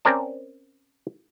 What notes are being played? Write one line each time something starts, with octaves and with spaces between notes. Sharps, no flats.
C4 C#4 A#4 D5 A5